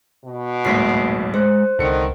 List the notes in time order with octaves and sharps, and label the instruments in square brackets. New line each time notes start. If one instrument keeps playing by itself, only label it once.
[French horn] B2
[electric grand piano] A1 D2 G#2 [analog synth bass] F#3 [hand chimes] A#3 B6 C7
[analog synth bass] G#3 [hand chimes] C5
[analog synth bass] C2 [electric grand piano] D3 C#7 [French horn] D#3